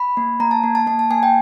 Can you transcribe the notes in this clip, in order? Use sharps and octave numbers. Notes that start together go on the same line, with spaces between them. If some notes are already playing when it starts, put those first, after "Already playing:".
Already playing: B5
A#3
A#3 A#5
A5
A#3
A5
A#3 A5
A5
A#3 G#5
G5